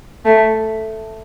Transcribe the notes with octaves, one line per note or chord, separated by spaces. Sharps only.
A3